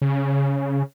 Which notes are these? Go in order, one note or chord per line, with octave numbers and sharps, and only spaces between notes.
C#3